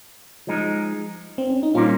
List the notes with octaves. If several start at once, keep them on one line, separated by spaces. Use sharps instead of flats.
F3 G#3 D#4
C4
C#4
D#4
A#2 G3 A#3 C#4 F4